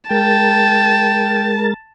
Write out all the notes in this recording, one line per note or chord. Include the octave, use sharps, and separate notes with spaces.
G#3 A#4 G5 A5 A6